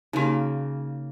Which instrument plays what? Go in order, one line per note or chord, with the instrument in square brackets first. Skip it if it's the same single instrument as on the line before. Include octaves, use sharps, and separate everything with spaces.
[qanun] C#3 A#3 [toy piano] D#4 F#4